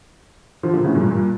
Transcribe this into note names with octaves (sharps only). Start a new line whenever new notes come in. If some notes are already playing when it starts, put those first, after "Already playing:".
D3 F3
A#2 D3
A2 C#3
G2 A#2
G2 A#2